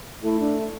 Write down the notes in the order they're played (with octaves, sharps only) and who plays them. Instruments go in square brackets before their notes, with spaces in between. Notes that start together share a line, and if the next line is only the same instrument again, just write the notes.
[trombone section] A3 [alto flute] E4
[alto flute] D4